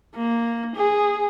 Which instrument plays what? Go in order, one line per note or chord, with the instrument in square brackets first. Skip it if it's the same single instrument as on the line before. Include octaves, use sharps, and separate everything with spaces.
[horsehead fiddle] A#3
G#4